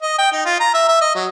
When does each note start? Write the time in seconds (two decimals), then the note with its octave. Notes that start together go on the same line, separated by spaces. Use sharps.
0.02 D#5
0.18 G5
0.32 D#4
0.45 F4
0.60 A#5
0.74 E5
0.88 E5
1.01 D#5
1.15 F#3